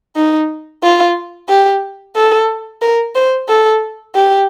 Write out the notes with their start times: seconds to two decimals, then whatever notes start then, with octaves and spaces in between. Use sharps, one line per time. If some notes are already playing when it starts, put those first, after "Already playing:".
0.16 D#4
0.83 F4
1.49 G4
2.16 A4
2.82 A#4
3.15 C5
3.49 A4
4.15 G4